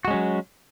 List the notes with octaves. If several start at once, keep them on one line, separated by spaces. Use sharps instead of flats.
F#3 G#3 C#4 F#4